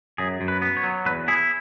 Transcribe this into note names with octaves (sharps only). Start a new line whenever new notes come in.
F#2 G#4
F#2
B4
B3
C#5
F#3
E2 B4
E4 G#4